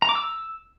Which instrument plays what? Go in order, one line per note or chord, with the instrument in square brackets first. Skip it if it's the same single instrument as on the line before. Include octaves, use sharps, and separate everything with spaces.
[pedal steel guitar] A#5
D6
E6